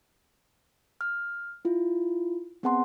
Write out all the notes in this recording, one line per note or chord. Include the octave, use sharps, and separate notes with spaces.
F6
E4 F4
B3 C4 G#4 F#5 A5 C6